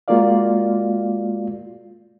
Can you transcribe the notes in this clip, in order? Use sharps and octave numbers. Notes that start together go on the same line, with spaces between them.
G#3 A#3 F4 F#4 D5 F5